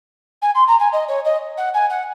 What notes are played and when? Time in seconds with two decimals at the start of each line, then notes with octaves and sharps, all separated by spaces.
0.42 G#5
0.55 C6
0.67 A#5
0.79 G#5
0.92 D#5
1.08 C#5
1.25 D#5
1.57 F#5
1.74 G#5
1.90 F#5